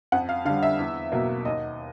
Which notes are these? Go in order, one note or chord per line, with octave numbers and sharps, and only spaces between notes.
F2 F#5
F5
D3 G3 F5
E5
E2
B2 F#3 A#3
D#2 D#5